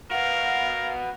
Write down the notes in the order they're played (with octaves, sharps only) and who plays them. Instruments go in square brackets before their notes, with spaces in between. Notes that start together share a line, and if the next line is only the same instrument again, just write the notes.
[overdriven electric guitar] B3 F#4 [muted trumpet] A#4 [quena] F5